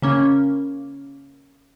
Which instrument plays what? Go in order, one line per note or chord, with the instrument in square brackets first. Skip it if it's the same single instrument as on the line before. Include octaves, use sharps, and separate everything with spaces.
[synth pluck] C#3 A#3 C#4